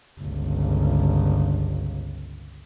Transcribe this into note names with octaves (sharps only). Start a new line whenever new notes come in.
G1 C#2